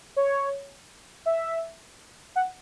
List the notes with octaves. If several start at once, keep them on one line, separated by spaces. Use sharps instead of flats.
C#5
E5
F#5